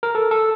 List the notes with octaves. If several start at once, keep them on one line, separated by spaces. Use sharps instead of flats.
A#4
A4
A4